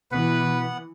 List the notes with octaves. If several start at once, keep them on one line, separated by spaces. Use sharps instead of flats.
B2 E3 B3 B4 F#5